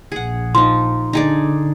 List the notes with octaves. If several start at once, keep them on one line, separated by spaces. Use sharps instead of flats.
A#1 G#4 F#5
F3 D#4 C6
D3 D#4 G#4 D5